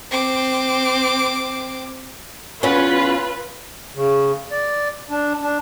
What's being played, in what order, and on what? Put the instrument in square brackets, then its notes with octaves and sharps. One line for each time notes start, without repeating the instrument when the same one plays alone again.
[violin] C4 D6
[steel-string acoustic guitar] E2 C#4 [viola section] F4 B4 B5
[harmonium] C#3
D5
D4
D4